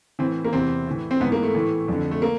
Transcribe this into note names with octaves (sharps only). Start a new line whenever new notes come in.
A2 E3 C4
A#3
E2 C3 E3 C4
A2 E3
C4
G#2 E3 B3
A#3
A3
A2 E3
F2 D3
A3
A#3